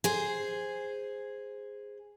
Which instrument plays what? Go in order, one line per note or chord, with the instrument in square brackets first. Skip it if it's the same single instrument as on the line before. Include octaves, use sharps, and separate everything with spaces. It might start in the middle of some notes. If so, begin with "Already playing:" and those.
[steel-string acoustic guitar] G#4 C5